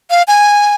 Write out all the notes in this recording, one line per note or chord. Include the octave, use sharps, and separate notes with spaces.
F5
G#5